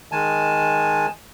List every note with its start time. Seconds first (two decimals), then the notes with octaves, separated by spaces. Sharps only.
0.12 D#3 G#3 G#5 A5